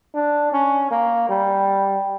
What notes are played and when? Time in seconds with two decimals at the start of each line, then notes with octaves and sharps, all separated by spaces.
0.14 D4
0.53 C#4
0.91 A#3
1.29 G3